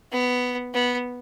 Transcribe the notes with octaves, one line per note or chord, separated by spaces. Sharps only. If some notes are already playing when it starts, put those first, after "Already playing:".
B3
B3